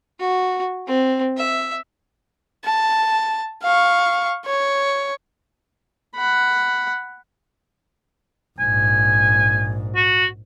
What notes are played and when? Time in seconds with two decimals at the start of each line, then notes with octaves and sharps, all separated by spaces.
0.20 F#4
0.87 C4
1.38 E5
2.65 A5
3.63 F5 C#6
4.45 C#5
6.16 F#5 B5
8.59 A#1 G#2 G#5
9.96 F#4